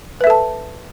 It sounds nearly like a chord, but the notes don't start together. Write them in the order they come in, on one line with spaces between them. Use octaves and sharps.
B4 E5 A4 A5